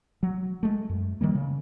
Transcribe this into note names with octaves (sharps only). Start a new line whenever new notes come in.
F#3
G#3 A3
F#2
D#3 G3 A#3
C#3